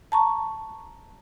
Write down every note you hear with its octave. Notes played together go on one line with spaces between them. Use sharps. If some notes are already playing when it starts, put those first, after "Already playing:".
A5 A#5 C#6